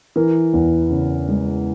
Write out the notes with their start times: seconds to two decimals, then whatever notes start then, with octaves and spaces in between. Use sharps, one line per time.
0.16 E3 A#4
0.53 E2
0.90 C#3
1.28 G#3